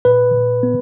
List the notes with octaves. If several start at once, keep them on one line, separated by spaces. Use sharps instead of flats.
A#2 B4
A#2
B3